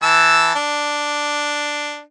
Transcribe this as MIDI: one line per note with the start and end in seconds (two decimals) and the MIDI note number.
0.03 0.54 52
0.03 0.54 81
0.03 0.54 88
0.55 2.01 62